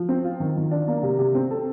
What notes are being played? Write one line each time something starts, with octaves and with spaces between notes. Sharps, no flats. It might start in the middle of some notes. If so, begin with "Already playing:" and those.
Already playing: F3
C4
F4
D#3
D#3
D4
A#3
C3
C3
C4
A4